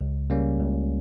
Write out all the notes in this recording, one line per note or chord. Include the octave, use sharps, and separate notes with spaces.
C#2
C#3 G3 A#3 C#4
C#2